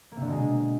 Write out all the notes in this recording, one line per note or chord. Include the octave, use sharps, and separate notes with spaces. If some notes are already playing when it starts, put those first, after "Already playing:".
A#3
C3
D3
B2
G#3